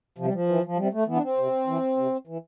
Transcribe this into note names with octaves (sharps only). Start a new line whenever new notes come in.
C3 F3
G3
F3
E3
F3
C3 G3
A3
E3 B3
D4
C4
C3
E3
C3
E3